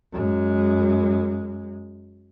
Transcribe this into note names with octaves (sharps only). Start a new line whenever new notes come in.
F#2 G#3